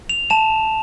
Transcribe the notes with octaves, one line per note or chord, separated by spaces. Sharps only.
F7
A5 E7